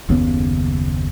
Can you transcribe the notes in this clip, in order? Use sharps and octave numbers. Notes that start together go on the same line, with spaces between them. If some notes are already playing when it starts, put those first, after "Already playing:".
F#1 D#2 C#3 B3